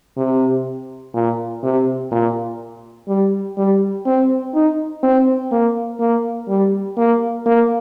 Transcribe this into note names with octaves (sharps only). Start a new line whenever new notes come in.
C3
A#2
C3
A#2
G3
G3
C4
D#4
C4
A#3
A#3
G3
A#3
A#3